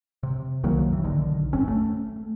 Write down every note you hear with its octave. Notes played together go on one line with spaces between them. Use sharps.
C3
C2 D#3 F#3 A#3
G2 E3
B1 D3 D#3
G#1 F#2 C4 C#4
A3